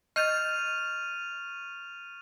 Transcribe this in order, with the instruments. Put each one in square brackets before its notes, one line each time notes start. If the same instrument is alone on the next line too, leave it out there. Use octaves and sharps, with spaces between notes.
[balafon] D#5 [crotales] C#6 D#7 F7 [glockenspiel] F6 G6 A6